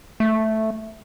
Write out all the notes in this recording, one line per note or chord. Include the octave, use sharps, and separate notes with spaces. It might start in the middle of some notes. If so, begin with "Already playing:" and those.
A3